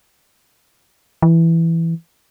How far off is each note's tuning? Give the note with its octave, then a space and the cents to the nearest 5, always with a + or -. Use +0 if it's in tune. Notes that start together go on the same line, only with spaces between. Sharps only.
E3 +5